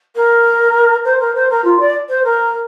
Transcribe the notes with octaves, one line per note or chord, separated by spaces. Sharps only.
A#4
C5
A#4
C5
A#4
F4
D5
C5
A#4